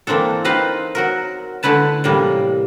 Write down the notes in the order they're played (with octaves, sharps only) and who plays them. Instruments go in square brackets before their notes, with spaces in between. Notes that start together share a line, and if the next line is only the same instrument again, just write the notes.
[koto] E3 A#3 C4 D4 A4
C4 D#4 B4 F5
F#3 F#4 A#4
D3 A3 E4 B4 A5
A2 C3 E3 G3 A#3